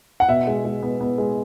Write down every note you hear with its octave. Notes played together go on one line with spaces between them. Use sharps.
F#5
B2 E5
G#3
G#3
B3
B3
G#3